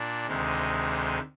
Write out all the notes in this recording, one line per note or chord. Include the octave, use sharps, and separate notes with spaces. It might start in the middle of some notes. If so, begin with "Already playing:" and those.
Already playing: A#2 D4
D2 C3 D#3 G#3